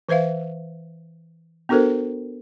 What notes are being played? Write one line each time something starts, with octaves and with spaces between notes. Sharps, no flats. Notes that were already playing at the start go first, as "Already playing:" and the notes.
E3 B4 C5 E5 F5
B3 D4 F#4 A4 A#4 C5